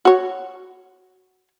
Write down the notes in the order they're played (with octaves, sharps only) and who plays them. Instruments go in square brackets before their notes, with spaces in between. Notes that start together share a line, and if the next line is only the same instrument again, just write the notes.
[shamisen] F#4 C#5